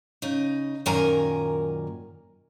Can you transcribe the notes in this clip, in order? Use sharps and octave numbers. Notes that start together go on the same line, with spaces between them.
C#3 D#4
F#2 A#2 D#3 A#4 G#5 A#5